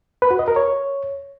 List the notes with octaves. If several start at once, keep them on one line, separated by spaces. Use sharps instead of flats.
B4
F#4
D#5
A#4
C#5